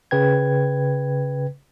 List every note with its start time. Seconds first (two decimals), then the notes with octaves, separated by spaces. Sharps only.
0.11 C#3 B4 G5 G#6